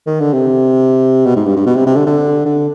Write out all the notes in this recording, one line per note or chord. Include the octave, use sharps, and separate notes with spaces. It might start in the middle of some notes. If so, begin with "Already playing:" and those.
D#3
D3
C3
B2
G#2
G2
G2
B2
C3
C3
D3
D3
D3